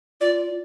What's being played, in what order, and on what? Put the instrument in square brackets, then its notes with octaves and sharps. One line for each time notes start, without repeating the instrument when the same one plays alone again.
[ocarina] F4 [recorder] D5